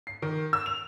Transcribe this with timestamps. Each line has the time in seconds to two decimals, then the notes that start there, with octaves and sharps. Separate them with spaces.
0.07 C7
0.22 D#3
0.53 E6
0.66 F7